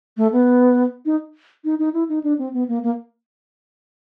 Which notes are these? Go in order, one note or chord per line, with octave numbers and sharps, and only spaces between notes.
A3
B3
D#4
D#4
D#4
E4
D#4
D4
C4
B3
A#3
A#3